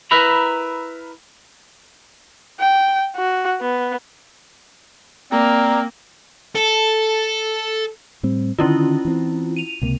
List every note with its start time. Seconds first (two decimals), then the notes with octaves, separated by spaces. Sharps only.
0.11 E4 A#4 B4 E5 A#5 B5
2.60 G5
3.16 F#4
3.61 B3
5.31 A#3 C4 D5 A#5
6.55 A4
8.23 A2 G3 C4
8.59 D3 D#3 C#4 E4 F4
9.05 E3 C4
9.56 D#7 F7
9.82 C#2 C3 A#3